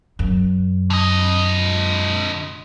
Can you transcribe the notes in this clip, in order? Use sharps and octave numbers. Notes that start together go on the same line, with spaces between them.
F#2
D3 D#5